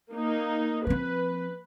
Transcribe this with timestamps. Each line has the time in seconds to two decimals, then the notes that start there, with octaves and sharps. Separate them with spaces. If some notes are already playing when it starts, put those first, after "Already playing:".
0.13 A#3 D#4
0.87 F3 C4 B4